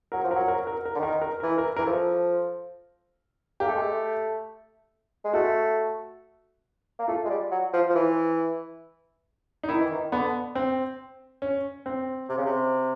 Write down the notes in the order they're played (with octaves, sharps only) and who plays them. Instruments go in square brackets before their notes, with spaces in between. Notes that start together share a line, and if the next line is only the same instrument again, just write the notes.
[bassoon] F#3 [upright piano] A#4
[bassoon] F3
[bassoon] F#3 [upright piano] A#4
[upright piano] A#4
A#4
A#4
[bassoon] D3
[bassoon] D#3 [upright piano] A#4
[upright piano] A#4
[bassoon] E3 [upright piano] A#4
[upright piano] A#4
[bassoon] E3 [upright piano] A#4
[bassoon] F3 [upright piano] A4
[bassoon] A#3 [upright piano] G4
[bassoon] A3
G#3
A3
G#3
[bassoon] A3 [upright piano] F#4
[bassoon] A#3
[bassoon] A3 [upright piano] F4
[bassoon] G#3
G3
F#3
F3
F3
E3
[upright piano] D#4
[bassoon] D#3 [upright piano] E4
[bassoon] E3
D#3
[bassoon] D3 [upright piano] B3
[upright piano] C4
C#4
C4
[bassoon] C3
C#3
C3